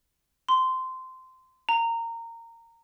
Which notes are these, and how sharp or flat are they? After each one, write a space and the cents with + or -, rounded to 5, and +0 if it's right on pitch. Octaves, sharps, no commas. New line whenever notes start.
C6 -15
A#5 -20